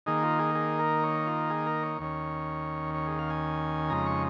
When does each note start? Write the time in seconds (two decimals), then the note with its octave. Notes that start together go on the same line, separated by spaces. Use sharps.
0.06 D#3 A#3 D#4 G#4
0.23 F4
0.39 G#4
0.55 G#4
0.79 A#4
1.03 C#5
1.27 F4
1.50 G#4
1.67 A#4
1.83 C#5
1.99 D#2 D#3 C#4
2.94 C#5
3.07 G#4
3.19 F5
3.30 G#5
3.90 F2 C#3 G#3 D#4 A#5
4.06 C#6